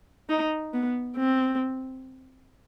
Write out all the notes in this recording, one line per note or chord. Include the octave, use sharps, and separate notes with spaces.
D#4
B3
C4